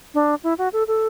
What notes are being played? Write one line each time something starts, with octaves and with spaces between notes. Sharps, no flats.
D4
E4
F#4
A4
A4